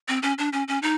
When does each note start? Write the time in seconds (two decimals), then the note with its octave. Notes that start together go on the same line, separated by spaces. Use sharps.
0.08 C4
0.23 C#4
0.38 D4
0.53 C#4
0.68 C#4
0.82 D#4